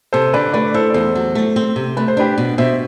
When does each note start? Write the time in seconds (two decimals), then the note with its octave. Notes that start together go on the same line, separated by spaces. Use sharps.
0.13 C3 A4 C5
0.34 D3 B4 D5
0.53 A3 B4 D5
0.74 E4 A4 C5
0.90 D5
0.94 E2 A4 C5
1.15 F#3
1.35 A3
1.56 C4
1.76 C3
1.97 A3 B4
2.08 C5
2.17 D4 G4 B4
2.38 B2
2.58 B2 C5 E5